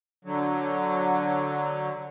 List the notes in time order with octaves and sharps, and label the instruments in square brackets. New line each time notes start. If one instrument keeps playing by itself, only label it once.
[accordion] D3 F#3